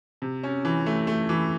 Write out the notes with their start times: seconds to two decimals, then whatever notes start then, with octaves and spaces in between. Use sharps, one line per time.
0.22 C3
0.43 C#4
0.65 E3
0.86 A3
1.07 A3
1.29 E3